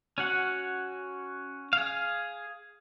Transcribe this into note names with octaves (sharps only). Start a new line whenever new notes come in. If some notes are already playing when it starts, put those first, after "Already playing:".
C#4 F#4 F#5
G#4 F5